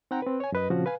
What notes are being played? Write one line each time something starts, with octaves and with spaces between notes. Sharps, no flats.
C4 D#4 F#5 G5 A#5
C4 B4
C#5 G#5
F#2 B4 D#5
A#2 C#3 F3 C4 C#4 F#4
B4 F5 G#5